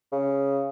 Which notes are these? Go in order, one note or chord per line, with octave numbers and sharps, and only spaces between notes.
C#3